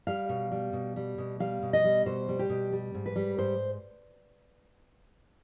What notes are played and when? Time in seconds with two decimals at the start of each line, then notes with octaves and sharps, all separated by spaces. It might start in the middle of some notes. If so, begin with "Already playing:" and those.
0.07 G3 F5
0.29 B2
0.52 G3
0.73 B2
0.96 G3
1.18 B2
1.40 G3 F5
1.62 B2
1.73 D#5
1.84 G3
2.06 B2 C5
2.28 G3
2.39 G4
2.49 B2
2.73 G3
2.94 G#2
3.06 B4
3.16 G3
3.38 G#2 C5